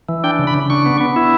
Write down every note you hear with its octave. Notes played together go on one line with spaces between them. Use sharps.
E3
D4 G5
C#3
B5
C#3
D4 C#6
B3
B3
E4